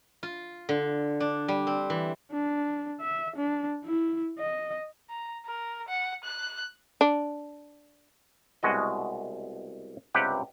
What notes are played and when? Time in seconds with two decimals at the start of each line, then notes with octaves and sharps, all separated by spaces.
0.23 F4
0.69 D3
1.20 D4
1.48 G3
1.67 C4
1.90 E3
2.32 D4
3.01 E5
3.36 D4
3.84 E4
4.39 D#5
5.09 A#5
5.46 A#4
5.88 F#5
6.24 F#6
7.01 D4
8.63 C2 B2 G#3 F#4 D#5
10.14 C#2 G2 C3 G4 B4 F#5